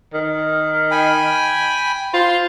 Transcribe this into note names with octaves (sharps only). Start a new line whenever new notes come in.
D#3
G5 G#5 B5
F4 C5 C6